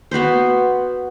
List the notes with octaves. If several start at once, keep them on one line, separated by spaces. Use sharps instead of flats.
B3 F#4 B4 C5